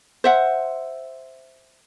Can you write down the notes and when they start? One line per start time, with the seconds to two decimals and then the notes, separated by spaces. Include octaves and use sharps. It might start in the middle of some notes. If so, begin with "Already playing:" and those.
0.24 C5 E5 F#5